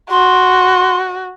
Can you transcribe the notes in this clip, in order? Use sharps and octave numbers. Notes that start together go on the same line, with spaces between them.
F#4 C6